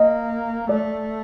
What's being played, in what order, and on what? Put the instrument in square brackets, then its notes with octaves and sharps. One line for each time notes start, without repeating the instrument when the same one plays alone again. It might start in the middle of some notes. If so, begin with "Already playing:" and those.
Already playing: [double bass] A#3 [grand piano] D#5
[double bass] A3 [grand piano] D5